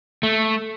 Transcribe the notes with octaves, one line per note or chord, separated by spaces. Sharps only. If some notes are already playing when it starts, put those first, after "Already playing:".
A3